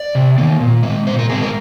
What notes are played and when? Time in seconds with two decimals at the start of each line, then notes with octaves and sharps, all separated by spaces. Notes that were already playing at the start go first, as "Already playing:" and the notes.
Already playing: D5
0.15 C3
0.38 D#3 A#3
0.60 A#2
0.83 G#3 C4
1.07 A#2 C5
1.19 A#4
1.30 G#3 C4 G#4
1.42 A#4